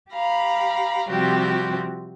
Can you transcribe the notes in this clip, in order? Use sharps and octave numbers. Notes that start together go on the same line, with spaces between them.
G4 F5 A#5 B5
C3 F3 G3 C4 F#4 G4